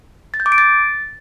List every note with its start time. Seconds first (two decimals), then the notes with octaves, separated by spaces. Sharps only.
0.34 A6
0.40 G6
0.46 D6
0.52 D7
0.58 A6